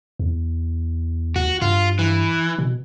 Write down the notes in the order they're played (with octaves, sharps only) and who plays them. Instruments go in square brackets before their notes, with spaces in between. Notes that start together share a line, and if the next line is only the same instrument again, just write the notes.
[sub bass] E2
[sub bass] D#2 [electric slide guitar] F#4
[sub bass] G2 [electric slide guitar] F4
[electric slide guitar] E3
[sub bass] B2